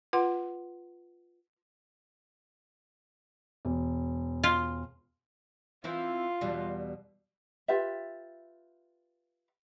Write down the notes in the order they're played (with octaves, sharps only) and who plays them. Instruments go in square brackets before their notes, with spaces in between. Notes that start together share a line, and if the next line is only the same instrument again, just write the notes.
[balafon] F4 B4 F#5 C6
[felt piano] E1
[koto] F4
[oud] E3 C4 E4 [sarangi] F4
[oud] E2 B2 G3
[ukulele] F4 G4 B4 E5